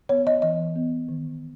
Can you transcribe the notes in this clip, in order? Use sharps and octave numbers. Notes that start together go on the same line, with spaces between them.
B3 C#5
D#5
E3 D#5
B3
D#3